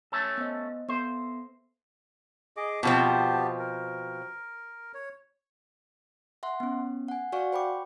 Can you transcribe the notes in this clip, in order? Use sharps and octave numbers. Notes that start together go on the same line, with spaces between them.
A3 C#4 A4 C#5
B3 C5 D#5
B3 A4 C5 E5
G#4 D#5 D6
B2 F3 B3 C4 G4 A5
A#4
C#5
E5 F#5 C6
B3 C#4
F#5 G#5
F#4 D5 F5 F#5 G#5 C#6
C5 G5 B5 C#6 D6